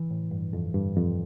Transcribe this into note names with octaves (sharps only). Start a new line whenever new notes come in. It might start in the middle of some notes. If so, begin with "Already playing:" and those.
Already playing: E3
A2
G2
F2
G2
F2